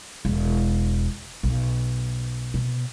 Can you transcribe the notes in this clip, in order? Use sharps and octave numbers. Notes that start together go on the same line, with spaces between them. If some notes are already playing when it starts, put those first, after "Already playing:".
E1
B1
B2